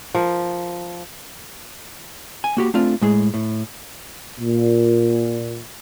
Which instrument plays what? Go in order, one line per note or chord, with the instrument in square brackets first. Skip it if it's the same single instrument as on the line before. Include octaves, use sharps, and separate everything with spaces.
[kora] F3 A#4
[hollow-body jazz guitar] G#5
A#3 F#4 G4
A3 C4 D4 F4
A2 G#3 G#4
A2
[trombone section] A#2